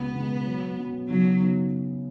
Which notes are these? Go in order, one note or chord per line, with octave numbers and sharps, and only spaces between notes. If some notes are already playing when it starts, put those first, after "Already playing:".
Already playing: C#2 B2 G#3 B3
C#2 B2 G#3
B2 F#3 C#4
B2 F#3 C#4
C#3 F#3 B3 D#4
C#3 B3 D#4